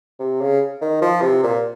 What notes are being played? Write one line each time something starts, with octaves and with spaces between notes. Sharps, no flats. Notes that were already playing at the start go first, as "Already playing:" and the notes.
C3
C#3
D#3
F3
C3
A#2